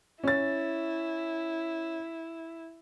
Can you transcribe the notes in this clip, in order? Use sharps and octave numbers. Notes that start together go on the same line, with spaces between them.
C#4 E4 A6